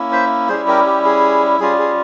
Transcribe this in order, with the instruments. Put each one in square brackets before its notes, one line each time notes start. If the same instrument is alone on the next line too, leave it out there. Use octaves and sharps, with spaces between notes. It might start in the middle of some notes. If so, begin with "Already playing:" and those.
Already playing: [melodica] A#3 C#4 E4
C5 E5
G3 C#4 E4 G#4 C5
G4 A#4
G4
G#4
G3 C#4 F4 G#4
G#4